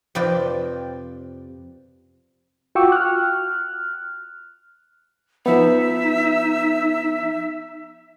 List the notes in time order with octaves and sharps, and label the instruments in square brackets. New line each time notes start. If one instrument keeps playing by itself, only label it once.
[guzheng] F2 C3 F4 B4 D5 G5
[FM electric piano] F4 F#4 G5 C#6 D6 E6
F6 F#6
[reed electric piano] F3 B3 [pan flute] D#4 [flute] E5